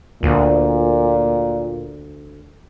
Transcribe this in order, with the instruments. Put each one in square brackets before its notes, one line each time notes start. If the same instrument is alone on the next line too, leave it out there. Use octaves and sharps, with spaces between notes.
[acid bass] D2 [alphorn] A#2